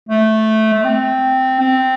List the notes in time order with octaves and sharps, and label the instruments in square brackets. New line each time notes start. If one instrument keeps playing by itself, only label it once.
[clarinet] A3
A3
C4
C4